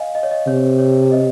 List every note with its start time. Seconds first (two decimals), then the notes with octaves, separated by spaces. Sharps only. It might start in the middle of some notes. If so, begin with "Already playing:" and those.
Already playing: D#5 F5 G#5
0.15 D#5
0.23 C#5
0.31 D#5
0.47 C3 C#5
0.79 C#5
1.12 D#5